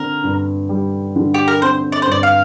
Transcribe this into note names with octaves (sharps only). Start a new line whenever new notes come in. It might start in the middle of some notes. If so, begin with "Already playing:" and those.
Already playing: D3 C4 A#4
G2
G3
D3
G4
A#4
C4 C5
D5
C5
G2 D5
F5